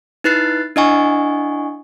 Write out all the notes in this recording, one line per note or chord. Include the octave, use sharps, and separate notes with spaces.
D#4 E4 B4 F#6 A6 C7
D4 E4 D#5 F#5 G#5 C#6